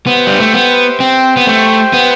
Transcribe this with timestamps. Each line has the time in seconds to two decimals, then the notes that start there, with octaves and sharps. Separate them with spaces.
0.06 B3 G4 C5 E5 G5
0.27 G3
0.40 A3
0.53 B3
1.00 C4
1.37 B3
1.47 A3
1.93 B3